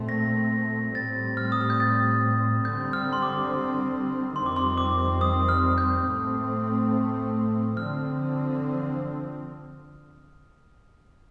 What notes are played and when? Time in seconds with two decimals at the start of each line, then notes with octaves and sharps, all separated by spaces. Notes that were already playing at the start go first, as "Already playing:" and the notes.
Already playing: A#2 A3 C4
0.09 A#6
0.95 A2 G3 C4 A6
1.37 F6
1.52 D#6
1.61 F6
1.70 G6
1.80 A6
2.65 D3 G3 C4 G6
2.93 F6
3.13 C6
3.22 D6
4.36 F2 D#3 G3 C4 C6
4.46 D6
4.56 C6
4.78 D6
5.21 D#6
5.49 F6
5.78 G6
6.06 A2 A3 C4
7.77 D3 F3 C4 F6